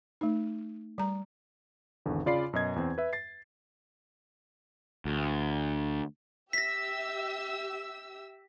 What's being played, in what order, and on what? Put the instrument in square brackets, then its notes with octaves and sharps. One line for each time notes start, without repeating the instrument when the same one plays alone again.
[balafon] A3 D#4
G3 A#5
[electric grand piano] G#1 E2 D3
C#3 F4 D5 B5 C7
F#2 B2 D#5 G#6
E2 C4
B4 E5
A6 C7
[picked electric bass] D2
[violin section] G4 E5 E6 [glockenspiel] A#6 B6